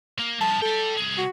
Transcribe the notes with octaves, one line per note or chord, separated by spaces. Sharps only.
A#3
G2 F3 A5
A4 D5 G5
C2 G#4
F#4